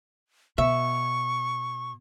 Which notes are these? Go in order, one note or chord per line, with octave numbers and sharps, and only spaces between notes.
B2 E5 C#6